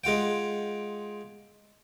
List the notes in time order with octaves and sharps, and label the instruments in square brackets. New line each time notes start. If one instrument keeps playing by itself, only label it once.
[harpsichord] G#3 F4 F#5 G5